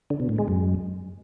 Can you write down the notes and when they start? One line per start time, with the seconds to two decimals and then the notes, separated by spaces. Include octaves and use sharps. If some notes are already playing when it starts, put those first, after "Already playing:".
0.10 D3
0.20 B2
0.29 A2
0.38 G#3
0.48 F#2